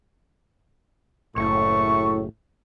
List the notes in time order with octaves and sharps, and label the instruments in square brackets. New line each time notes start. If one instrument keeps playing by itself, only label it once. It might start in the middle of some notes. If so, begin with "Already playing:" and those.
[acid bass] F#1 [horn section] A2 [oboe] C#6